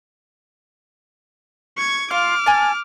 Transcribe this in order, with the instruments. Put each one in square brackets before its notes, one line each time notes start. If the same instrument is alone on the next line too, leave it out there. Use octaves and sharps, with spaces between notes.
[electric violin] C#6 G#6
[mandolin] F4 [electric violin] D6 F6
[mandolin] G#5 A5